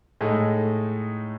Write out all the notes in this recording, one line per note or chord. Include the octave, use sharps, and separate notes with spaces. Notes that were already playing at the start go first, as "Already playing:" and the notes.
A2 G#3 D#4 A4